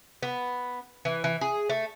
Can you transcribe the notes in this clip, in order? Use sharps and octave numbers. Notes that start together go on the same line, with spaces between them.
B3
E3
E3
G#4
A3